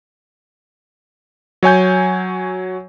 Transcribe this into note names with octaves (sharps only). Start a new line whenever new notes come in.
F#3 C#5 G#5 G6